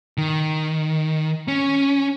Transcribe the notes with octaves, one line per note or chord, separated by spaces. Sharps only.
D#3
C#4